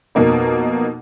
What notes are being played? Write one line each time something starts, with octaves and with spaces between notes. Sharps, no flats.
F2 B2 A#3 D#4